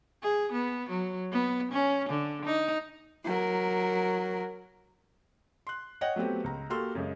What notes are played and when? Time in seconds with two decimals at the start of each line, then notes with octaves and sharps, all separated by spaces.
0.23 G#4
0.52 B3
0.90 F#3
1.32 B3
1.72 C#4
2.09 D3
2.46 D#4
3.24 F#3 A#4
5.67 C6 F#6
6.01 C#5 D#5 F#5 G5
6.16 F#3 A3 B3 C4 G4
6.44 C#2 A#5
6.70 A#3 F#4 G4 A4 C6 F6
6.95 F#2 C#3 G#3